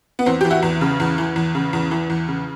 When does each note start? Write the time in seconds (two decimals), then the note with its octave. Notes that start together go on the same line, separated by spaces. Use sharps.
0.19 B3
0.26 E2 C4
0.41 E3 G4
0.50 E4 F#4
0.63 E2
0.81 C#3
1.00 E2
1.18 E3
1.36 E2
1.55 C#3
1.73 E2
1.91 E3
2.10 E2
2.28 C#3